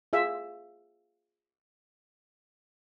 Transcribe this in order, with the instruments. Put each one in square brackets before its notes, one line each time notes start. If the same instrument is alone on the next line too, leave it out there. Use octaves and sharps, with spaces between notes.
[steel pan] F4 G#4 E5